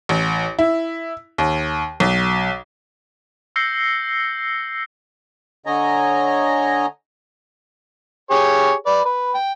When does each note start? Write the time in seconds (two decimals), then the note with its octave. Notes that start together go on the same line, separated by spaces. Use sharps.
0.09 A1
0.59 E4
1.38 D#2
2.00 B1
3.56 E6 G6 A#6 C7 C#7 G7
5.66 D3 C#5 D#5 G#5 A#5
8.31 G4 G#4 C#5
8.86 B4 D5
9.05 B4
9.35 G5